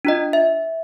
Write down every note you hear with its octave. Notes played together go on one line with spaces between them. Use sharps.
D4 F4 D#5
E5